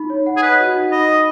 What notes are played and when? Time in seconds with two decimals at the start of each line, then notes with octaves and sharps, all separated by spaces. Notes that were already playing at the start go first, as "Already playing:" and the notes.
Already playing: D#4 B5
0.10 C#5
0.26 F#5
0.37 G#4
0.42 B4 D#5
0.59 F#4
0.75 D#4
0.92 D#5 B5
1.09 B5